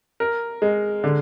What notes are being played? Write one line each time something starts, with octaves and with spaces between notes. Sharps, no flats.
A#4
G#3
D3